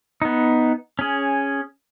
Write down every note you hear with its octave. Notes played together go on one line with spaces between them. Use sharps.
B3 D#4
C#4 G#4